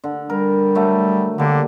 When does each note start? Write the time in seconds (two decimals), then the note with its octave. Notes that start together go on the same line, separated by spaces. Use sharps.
0.04 D3
0.30 G3 A#4
0.75 F#3 A3
1.38 D3 G3 A#3